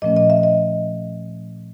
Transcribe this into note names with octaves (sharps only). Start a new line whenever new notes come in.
A#2 F3 A3 C#4 D#5
D#5
E5
D#5